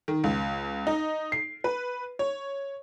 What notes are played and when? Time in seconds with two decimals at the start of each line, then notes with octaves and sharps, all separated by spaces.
0.08 D#3
0.24 C#2
0.87 D#4
1.32 C7
1.64 B4
2.19 C#5